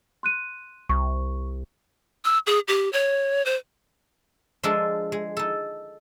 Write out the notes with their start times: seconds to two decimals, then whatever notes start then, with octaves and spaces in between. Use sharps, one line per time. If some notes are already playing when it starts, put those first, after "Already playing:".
0.23 C6 F#6 D#7
0.89 C2 C#6
2.25 E6
2.47 G#4
2.68 G4
2.93 C#5
3.46 C5
4.63 F3 G#3 D4 A4 A#4 D#5
5.12 G#3
5.37 D#4 A4